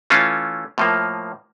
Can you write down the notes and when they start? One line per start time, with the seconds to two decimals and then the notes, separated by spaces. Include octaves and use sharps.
0.10 E3 A3 C#4 F4
0.78 A2 F3 A#3